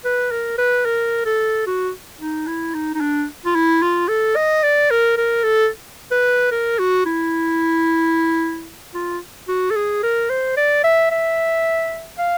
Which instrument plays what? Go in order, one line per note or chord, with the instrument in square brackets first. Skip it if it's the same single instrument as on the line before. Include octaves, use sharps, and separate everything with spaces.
[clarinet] B4
A#4
B4
A#4
A4
F#4
D#4
E4
D#4
D#4
D4
F4
E4
F4
A4
D#5
D5
A#4
A#4
A4
B4
A#4
F#4
E4
F4
F#4
A4
G#4
A#4
C5
D5
E5
E5
F5